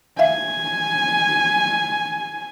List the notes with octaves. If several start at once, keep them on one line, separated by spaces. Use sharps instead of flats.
E5 F5 G#5